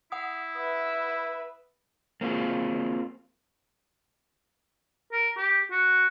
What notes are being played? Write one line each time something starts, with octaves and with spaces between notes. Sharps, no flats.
E4 F#5 D#6
B4 E5
A#3 C4 F4 F#4 G#4
A#4
G4
F#4